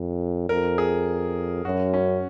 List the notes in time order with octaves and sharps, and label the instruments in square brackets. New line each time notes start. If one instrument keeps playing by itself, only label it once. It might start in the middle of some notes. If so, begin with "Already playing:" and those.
Already playing: [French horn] F2
[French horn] F2 [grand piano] A#4
[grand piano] G#4
[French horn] F#2 [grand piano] F#4
[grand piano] C#4